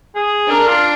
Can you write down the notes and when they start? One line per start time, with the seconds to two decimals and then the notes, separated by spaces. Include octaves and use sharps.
0.15 G#4
0.50 D4 A#4
0.67 F4